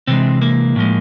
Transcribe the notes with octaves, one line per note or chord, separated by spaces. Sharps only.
C3 E3 G#3 C4
A#3
A2 F3 G#3